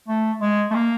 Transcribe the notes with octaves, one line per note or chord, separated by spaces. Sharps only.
A3
G#3
A3
A#3